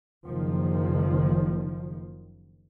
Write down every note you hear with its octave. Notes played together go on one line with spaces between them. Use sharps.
F#1 D#3 F3